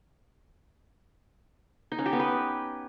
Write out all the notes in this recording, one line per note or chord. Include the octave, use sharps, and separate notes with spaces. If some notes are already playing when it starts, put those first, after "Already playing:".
D#4
C#4
G4
B3
B4